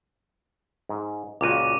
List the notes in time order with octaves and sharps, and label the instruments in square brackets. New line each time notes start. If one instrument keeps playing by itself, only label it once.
[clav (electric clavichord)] G#2
[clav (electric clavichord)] C#2 A#2 F#4 [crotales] D6 D#7